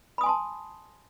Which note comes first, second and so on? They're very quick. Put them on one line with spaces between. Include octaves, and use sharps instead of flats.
B5 D#6 G#5 C6 A5